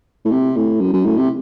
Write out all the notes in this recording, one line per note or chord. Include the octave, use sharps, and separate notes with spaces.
A2
C3
A2
F#2
F#2
A2
C3